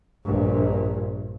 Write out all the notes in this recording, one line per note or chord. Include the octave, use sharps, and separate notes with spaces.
A#1 G2